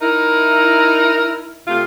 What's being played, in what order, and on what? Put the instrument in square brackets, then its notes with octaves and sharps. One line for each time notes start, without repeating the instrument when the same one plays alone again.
[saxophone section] D#4 E4 [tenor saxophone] A#4
[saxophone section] C3 A3 F4